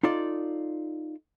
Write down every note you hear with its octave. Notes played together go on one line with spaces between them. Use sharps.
D#4 F4 A4 D5